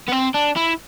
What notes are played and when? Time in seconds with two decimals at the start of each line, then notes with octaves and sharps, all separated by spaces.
0.09 B3
0.12 C4
0.34 D4
0.56 E4